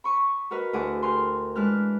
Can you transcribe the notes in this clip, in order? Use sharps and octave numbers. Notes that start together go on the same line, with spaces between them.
B5 C#6 D#6
F#4 A#4 B4 D#5
D2 E4 G#4 F#5 D6
G4 A#4 G#5 C6
E3 G#3 D4 B4 F6 F#6